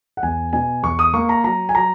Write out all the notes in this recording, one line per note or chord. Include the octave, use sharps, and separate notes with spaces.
F#5
E2 G#5
B2 G#5
E2 C#6
D#6
A#3 C#6
A#5
F#3 A#5
G#5
F#3 A#5